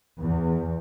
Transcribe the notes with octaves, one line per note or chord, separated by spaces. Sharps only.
E2